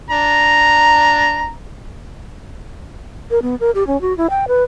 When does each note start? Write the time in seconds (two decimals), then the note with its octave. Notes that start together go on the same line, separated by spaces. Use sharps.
0.10 D4 A#5
3.31 A#4
3.42 B3
3.61 A#4
3.75 G4
3.87 C#4
4.01 F#4
4.17 E4
4.30 G5
4.48 B4